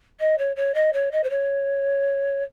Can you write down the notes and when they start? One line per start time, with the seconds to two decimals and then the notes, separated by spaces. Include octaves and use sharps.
0.19 D#5
0.38 C#5
0.56 C#5
0.74 D#5
0.93 C#5
1.11 D#5
1.23 C5
1.29 C#5